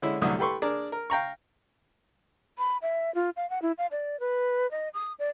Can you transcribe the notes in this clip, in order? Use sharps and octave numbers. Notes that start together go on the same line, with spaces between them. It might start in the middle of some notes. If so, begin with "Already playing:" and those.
D3 G#3 C#4 E4
C2 F#2 D3 A3 D#6
G4 A4 B4 C6 C#6
D4 G#4 A#4 D5
A#4
F5 G5 A#5 C#6
B5
E5
F4
F5
F#5
E4
F5
D5
B4
D#5
D#6
D5